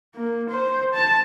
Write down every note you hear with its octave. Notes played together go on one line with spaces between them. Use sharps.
A#3
C5
A5